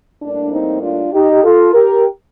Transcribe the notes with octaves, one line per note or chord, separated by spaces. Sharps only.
A2 G3 A#3 D4
C4 D#4
D4 F4
D#4 G4
F4 A4
G4 A#4